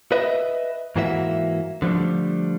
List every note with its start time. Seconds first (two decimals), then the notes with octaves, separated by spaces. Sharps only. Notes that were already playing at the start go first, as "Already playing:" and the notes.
0.12 B4 D#5 E5
0.96 G#2 E3 A#3 F#4 G4 E5
1.82 D3 F3 G3 A3